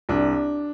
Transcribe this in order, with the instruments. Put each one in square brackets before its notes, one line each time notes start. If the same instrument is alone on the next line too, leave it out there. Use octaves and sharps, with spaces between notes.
[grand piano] C2 D4